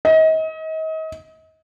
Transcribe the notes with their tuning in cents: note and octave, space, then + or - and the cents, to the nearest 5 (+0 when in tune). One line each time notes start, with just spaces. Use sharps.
D#5 +35